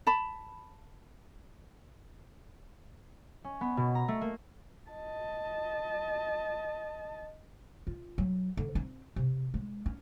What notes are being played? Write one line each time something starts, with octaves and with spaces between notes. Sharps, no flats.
A5 B5
C#4
B3
B2
A#5
A3
A#3
D#5 A5
F4
F#3
D3
C4
C3
G#3
C#4